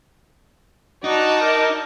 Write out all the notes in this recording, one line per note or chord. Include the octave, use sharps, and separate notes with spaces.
D#4 F#4 D5 A5
A#4